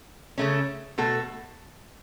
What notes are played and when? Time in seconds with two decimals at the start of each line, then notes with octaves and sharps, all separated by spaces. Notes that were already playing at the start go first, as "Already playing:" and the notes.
0.38 C#3 A3 C#4
0.98 B2 A3 F#4 A4